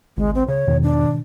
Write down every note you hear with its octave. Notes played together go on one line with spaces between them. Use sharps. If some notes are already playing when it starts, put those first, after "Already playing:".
G#1 C#2 G#3
C4
C#3 C#5
E2 G#2 B2 D#3
D4